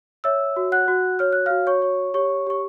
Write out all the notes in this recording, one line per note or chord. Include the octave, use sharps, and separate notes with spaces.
C#5 E5 E6
F#4
F#5 F#6
F#4
C#5 F6
F#6
F#4 F5 F6
C#5 C#6
C#5
G4 C#5 C#6
G4 C#6